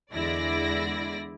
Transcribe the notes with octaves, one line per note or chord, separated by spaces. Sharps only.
E2 D3 G#3 E4 D5 A#6